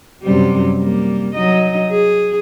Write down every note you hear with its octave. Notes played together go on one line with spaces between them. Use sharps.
F#2 C3 G3
G3 A#3
F#3 D#4 D#5
G#4